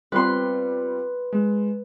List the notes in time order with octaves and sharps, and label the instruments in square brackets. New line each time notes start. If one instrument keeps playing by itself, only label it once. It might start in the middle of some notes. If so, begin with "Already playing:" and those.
[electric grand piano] G3 C4 F4 [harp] B4 C6
[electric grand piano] G#3